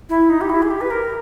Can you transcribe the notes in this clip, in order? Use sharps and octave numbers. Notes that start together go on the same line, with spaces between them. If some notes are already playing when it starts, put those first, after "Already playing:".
E4
D#4
G4
E4
G#4
G4
B4
A#4